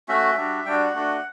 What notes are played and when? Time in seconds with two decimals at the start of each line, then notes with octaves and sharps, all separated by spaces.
0.08 A3 C#4 F#4 E5
0.37 G3 D4 F#4
0.65 G3 D4 F#4 G5
0.84 F#5
0.94 A3 D4 F#4